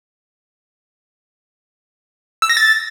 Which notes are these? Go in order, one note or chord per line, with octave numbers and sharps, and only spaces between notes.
E6
A#6
A6